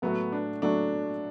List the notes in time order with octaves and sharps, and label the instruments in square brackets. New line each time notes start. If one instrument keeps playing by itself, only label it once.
[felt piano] A2 F#3 A3 F#4 [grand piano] B3
[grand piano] D4
[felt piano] A2 F#3 A3 F#4 [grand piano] D4